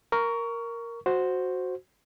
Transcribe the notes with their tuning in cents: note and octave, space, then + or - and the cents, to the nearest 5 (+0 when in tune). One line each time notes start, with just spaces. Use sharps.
A#4 +0 C#6 +20
F#4 -5 C5 +0